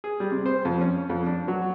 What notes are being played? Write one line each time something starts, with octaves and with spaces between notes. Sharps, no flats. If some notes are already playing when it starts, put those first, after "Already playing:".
G#4
G3
C3
C5
F2
C#4
F2
D4
F#3